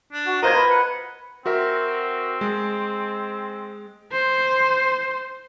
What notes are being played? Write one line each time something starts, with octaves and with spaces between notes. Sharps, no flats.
D4
F#4
F4 A#4 C5 D#5 G#6
A#4 B4
F#5
C4 F#4 A#4 E5
G#3
C5